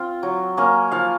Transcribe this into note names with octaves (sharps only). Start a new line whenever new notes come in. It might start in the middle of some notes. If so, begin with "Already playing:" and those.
Already playing: C4 F4
F#3
A#3 C#4
F3 F5